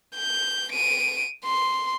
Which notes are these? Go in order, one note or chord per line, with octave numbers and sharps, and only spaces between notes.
G6
D7 D#7
C6